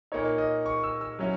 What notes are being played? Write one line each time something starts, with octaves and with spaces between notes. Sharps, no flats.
A#2 A#3 D#4 C#5
D#5
C#6
E6
E6
F#3 C#4 E4